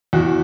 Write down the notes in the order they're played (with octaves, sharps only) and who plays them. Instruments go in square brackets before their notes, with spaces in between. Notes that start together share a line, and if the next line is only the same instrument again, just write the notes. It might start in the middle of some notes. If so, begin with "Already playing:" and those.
[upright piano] E2 F#4